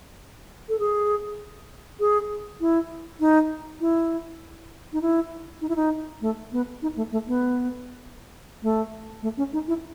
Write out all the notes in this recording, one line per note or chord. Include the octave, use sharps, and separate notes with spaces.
A4
G#4
G#4
E4
D#4
E4
D#4
E4
D#4
E4
D#4
A3
B3
D#4
A3
A3
B3
A3
A3
C#4
D#4
E4